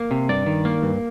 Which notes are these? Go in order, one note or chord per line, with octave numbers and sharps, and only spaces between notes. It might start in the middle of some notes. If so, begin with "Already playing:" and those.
Already playing: A#3
C3
G2 D5
D#3
A#3
G2